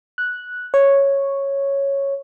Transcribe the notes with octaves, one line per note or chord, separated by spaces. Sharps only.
F#6
C#5